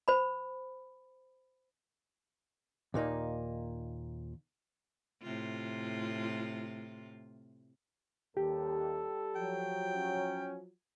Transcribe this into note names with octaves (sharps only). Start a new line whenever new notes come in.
C5 B5
D#2 A#2 A#3 D#4
A2 C3 F4
D#2 G3 G4 A4
F3 F#3 G5
C#4